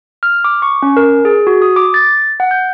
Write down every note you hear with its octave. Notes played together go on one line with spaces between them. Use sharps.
F6
D6
C#6
C#4
A#4
G#4
F#4
D#6
D6
A6
F#5
G6